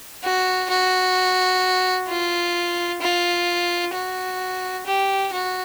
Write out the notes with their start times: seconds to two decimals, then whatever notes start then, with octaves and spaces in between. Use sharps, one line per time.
0.24 F#4
0.70 F#4
2.08 F4
3.01 F4
3.93 F#4
4.86 G4
5.32 F#4